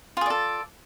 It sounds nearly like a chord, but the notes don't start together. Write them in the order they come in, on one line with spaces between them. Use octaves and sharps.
F4 G#4 D5 A4